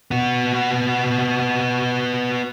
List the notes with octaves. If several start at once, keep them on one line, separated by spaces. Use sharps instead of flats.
B3 F#4